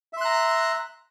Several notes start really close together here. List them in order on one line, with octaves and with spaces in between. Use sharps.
E5 C6 F#6 A#5